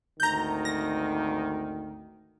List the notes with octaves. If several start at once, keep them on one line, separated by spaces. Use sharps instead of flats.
G#1 D2 D#3 A#5 G6
A#6